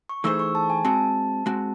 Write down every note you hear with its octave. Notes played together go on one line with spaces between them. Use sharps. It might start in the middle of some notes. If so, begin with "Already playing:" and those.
C#6
E3 A3 D#4 G#4 C5 E6
C#6
A5
G#5
G#3 C4 F#4 A5
G#3 C4 F#4